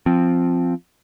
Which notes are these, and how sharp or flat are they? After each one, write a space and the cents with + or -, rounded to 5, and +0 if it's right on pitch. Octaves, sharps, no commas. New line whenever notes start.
F3 +0 C4 +0